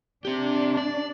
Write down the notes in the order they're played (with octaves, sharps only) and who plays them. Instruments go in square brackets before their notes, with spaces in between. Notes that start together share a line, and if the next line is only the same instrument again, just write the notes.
[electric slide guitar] C4 G4 [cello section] D4
[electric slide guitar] D5